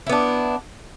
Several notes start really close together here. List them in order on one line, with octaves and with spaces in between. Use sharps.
E4 B3 D4